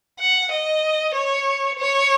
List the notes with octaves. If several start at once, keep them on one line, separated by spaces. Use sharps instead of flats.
F#5
D#5
C#5
C#5